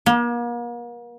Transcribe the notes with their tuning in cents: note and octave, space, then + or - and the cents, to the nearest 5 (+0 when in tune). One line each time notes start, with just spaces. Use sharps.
A#3 +40